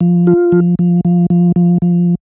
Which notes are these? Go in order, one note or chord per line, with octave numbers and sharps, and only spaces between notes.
F3
F4
F3
F3
F3
F3
F3
F3